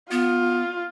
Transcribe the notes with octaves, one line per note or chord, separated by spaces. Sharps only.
B3 F4